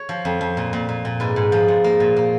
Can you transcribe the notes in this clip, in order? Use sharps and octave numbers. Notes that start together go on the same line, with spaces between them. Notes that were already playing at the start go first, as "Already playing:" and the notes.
Already playing: C#5
F3
F2
F2
A#2
A#2
A#2
A#2
G#2 B4
G#2
F3
G#2
A#3
A#2
A#3